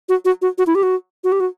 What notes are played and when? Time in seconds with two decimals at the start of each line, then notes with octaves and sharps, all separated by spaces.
0.09 F#4
0.25 F#4
0.42 F#4
0.58 F#4
0.67 E4
0.75 G4
0.83 F#4
1.24 F#4
1.32 G4
1.40 F#4